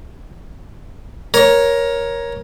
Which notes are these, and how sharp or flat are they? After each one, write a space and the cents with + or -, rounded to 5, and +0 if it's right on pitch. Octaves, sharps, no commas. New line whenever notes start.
A#4 +15 C#5 +0